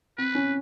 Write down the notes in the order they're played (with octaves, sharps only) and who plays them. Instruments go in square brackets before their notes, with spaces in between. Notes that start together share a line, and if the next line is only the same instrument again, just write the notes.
[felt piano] C4 [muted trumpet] B4
[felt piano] C#4